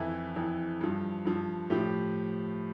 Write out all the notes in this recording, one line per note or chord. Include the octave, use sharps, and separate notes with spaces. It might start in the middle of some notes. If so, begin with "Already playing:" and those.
Already playing: F2 E3 E4
F2 E3
G2 F3
G2 F3
A2 F3 G4